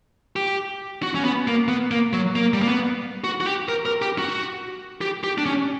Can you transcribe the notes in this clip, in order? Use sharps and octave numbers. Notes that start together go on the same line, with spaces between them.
G4
F#4
C#4
B3
A#3
B3
A#3
F#3
A#3
G3
A#3
B3
F#4
F#4
G4
A#4
A#4
G4
F#4
G4
G4
D4
C#4